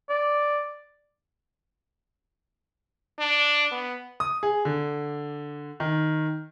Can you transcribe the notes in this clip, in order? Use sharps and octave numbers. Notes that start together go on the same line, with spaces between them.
D5
D4
B3
D#6
G#4
D3
D#3